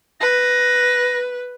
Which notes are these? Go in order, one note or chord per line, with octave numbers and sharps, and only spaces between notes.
B4 A#6